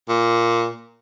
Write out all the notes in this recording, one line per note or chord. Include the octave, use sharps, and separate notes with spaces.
A#2